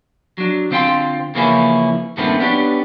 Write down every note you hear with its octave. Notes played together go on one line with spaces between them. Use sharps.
F#3 D4
D3 C4 F4 G#4 G5 C6
C#3 E3 F3 A#3 C#4 E4
G2 A#2 D#3 A3 B3 C4
B3 C#4 D4 G4